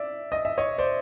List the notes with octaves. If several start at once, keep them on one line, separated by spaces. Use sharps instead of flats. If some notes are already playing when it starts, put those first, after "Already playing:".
Already playing: D5 E5
D#5
E5
C#5 D#5
C5 D5